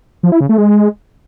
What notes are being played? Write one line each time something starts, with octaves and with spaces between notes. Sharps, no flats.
F3
E4
C#3
A3
G#3